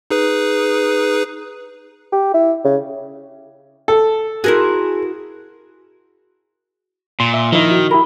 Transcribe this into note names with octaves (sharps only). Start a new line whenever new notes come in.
D#4 G#4 B4
G4
E4
C#3
A4
E4 F#4 G#4 A#4 C5
A#2 C6
E5
D#3 F3 D#4 E4
F#4
E4 G4 A#4 B5